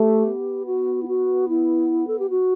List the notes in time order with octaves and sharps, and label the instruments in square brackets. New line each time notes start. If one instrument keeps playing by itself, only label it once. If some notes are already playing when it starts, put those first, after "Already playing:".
Already playing: [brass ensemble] A3 [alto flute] G4
[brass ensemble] B3
[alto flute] F#4
E4
F#4
E4
A4
G4
F#4